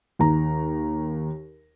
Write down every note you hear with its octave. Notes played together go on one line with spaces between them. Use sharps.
D#2 A#5